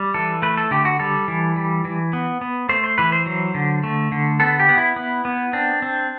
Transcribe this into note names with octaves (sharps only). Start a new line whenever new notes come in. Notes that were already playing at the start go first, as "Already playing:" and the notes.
Already playing: G3
E3 A4
A3 B4
A4
D3 G4
F#4
G3 A4
E3
G3
E3
B3
B3
A3 C5
C5
E3 B4
C5
F#3
D3
A3
D3
B3 A4
G4
B3
E4
B3
B3
C4 D4
C4